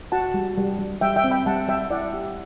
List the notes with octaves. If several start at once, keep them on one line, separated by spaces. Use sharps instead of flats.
F#4 F#5 A5
G3
G3
G3
G3 E5 G5
E5 G5
C4
G5 B5
G3 F#5 A5
G3 E5 G5
E4 D5 F#5
G4